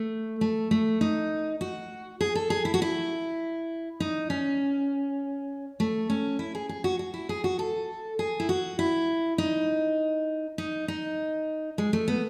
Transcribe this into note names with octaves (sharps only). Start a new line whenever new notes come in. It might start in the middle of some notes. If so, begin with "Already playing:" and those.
Already playing: A3
A3
A3
D#4
F#4
G#4
A4
G#4
E4
F#4
E4
D#4
C#4
A3
C#4
E4
G#4
G#4
F#4
F#4
E4
G#4
F#4
A4
G#4
E4
F#4
E4
D#4
D#4
D#4
G#3
A3
B3